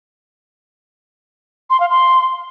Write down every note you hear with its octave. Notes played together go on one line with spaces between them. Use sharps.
C6
F5
C6